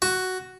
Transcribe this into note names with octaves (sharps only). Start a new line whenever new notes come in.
F#4